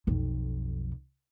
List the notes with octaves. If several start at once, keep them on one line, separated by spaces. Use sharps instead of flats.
B1 F2